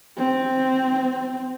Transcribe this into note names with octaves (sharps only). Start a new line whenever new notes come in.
C4